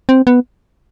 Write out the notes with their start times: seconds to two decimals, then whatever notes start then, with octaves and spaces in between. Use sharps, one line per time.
0.09 C4
0.27 B3